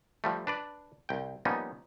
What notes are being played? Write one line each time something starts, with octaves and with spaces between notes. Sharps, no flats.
F3 G3 A3
D4 B4 D5
C2 G5
F3 G3 A#3 B3 C#4 D#4